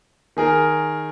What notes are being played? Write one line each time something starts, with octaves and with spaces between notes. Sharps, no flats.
D#3 G#4 A#4